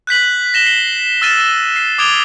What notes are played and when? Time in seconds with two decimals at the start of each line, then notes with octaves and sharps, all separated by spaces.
0.07 F#6 G6 B6 F#7
0.54 A#6 E7 G7
0.66 C7 G7
1.22 E6 F6 A6 D#7 E7 G7
1.76 C7
1.98 D6 D#6 G#6 D7 F7 G7